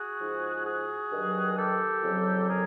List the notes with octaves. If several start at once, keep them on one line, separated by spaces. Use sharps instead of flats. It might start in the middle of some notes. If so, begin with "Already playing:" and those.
Already playing: F#4 G#4
G#2 F3
F#4 G#4
G2 D#3 F#3
G4 A4
F2 C#3 F#3
G#4 A#4